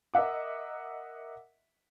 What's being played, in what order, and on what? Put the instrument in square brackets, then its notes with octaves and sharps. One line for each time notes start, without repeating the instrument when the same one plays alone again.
[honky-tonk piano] A#4 D#5 E5 F#5 D6